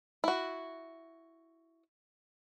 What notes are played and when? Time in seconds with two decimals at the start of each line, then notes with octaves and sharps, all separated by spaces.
0.24 E4 F#4